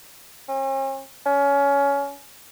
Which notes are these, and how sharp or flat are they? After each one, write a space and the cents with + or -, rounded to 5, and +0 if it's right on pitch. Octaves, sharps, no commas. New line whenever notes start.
C#4 -45
C#4 +20